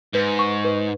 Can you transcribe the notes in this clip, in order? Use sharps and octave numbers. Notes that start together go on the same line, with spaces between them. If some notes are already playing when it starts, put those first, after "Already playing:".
G#2 B4
C#6
B4